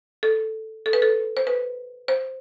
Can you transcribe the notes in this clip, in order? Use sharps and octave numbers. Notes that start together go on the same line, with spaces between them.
A4
A4
B4
A4
C5
B4
C5